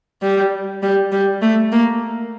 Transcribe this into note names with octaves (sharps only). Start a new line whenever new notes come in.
G3
G3
G3
A3
A#3